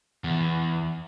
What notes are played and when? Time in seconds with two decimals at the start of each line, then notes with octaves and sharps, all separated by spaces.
0.24 E2